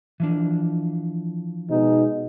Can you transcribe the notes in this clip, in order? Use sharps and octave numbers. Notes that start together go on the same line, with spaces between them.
E3 F3 D4
B2 G#3 D#4